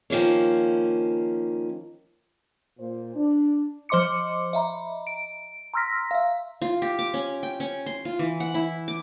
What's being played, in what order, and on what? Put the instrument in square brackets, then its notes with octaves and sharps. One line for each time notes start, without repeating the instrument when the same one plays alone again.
[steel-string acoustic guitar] D#3 F3 A#3 C#4
[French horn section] A#2 C5
D4
[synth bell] F3 C5 D#5 C6 D6 C#7
D#5 E5 A#5 B5
D7
A#5 C6 E6 F6 A#6 B6
E5 F5
[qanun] F4
G4
D6
C#4
G5
C#4
C6
F4
E3
F#5
E4
D6